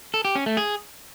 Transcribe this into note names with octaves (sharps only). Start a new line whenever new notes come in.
A4
G4
C#4
A3
G#4